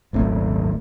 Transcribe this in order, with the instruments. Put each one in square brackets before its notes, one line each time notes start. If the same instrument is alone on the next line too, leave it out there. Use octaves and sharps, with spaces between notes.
[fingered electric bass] D#1 G#1 F#2 A3